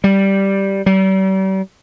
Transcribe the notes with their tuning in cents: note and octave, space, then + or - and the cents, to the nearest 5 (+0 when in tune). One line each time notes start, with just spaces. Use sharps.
G3 -5
G3 -40